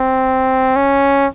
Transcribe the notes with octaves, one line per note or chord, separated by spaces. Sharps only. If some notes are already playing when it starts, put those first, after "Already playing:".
Already playing: C4
C#4